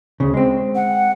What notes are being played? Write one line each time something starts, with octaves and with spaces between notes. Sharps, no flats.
D2 C#3
G#3 C4
F#5